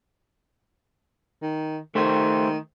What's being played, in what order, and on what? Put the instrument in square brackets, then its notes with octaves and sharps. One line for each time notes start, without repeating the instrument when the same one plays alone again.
[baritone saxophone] D#3
[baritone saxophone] D#3 [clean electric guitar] A3 G4 C5